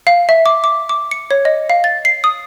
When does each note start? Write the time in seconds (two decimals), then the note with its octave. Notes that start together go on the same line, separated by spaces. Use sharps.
0.07 F5
0.29 E5
0.46 D6
0.64 D6
0.89 D6
1.11 C#7
1.31 C#5
1.45 D#5
1.70 F5
1.84 A6
2.05 C7
2.24 D#6